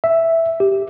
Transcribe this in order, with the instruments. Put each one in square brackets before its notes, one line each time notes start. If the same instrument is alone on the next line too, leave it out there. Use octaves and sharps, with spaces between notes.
[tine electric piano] E5
G4